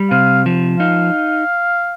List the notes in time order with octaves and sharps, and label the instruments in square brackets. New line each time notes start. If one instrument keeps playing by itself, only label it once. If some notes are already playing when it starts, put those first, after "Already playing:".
Already playing: [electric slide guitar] G3
[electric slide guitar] C3 [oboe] F5
[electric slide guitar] F3
[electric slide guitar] D#4 [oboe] F5